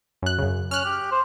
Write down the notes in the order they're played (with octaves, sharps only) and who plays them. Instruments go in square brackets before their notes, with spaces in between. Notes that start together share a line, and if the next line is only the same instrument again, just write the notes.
[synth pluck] F#2 F#6
F#2 C#3
[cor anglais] C#4 [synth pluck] F6 F#6
[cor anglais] G4
C5